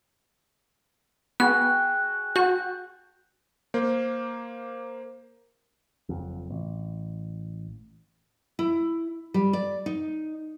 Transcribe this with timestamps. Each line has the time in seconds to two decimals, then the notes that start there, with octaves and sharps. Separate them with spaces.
1.40 B3 F#4 G#4 G5 F#6
2.36 F#4 A5 G6
3.74 A#3 C5
6.09 F#1 F2
6.51 A1
8.59 E4
9.34 G3
9.53 D5
9.86 D#4